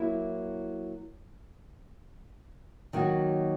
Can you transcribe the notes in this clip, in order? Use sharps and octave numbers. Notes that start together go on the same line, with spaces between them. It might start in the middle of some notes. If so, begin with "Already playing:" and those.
Already playing: F#3 A#3 E4
D#3 F#3 A#3 D#4 F#4